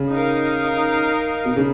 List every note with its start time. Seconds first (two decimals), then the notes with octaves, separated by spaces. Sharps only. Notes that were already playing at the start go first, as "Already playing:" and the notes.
Already playing: C#3
0.12 D#4 A#4 F5
1.45 B2
1.56 C#3